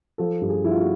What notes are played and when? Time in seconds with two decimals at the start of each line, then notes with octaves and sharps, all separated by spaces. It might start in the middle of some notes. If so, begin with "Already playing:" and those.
0.18 F3 A4
0.41 G2
0.49 G#4
0.64 F3 E4
0.71 F4
0.80 F#4